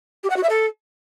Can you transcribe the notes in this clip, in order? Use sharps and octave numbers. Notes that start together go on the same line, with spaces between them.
G4
F#5
F#4
E5
A4